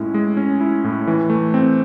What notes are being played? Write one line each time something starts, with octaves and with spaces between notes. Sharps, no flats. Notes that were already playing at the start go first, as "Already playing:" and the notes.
Already playing: A2 G#3 C#4 E4
G#3
C#4
E4
A2
E3
A3
C4